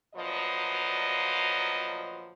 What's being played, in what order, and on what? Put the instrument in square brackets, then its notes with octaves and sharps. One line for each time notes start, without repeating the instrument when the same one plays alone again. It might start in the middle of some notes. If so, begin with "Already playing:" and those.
[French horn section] D2 A#2 F3 F#3 B4 D#5